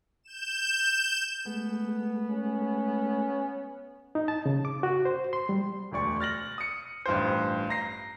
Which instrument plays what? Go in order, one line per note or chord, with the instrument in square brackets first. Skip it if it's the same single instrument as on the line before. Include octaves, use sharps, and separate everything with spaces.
[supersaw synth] G6 E7
[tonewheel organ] G#3 A3 [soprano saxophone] B3
[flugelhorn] C#4
[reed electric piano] D#4
A5
C#3
D6
F#4
C5
C6
G3
[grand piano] E1 D2 D5 C#6
F6 A6 A#6 F#7
D#6 C#7
A1 G2 F4 C5
A#5 A#6 C7